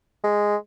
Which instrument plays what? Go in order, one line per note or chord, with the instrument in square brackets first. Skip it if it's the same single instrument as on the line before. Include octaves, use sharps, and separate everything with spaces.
[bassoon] G#3